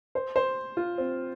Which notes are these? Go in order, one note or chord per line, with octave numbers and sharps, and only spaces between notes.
C5
C5
F4
C4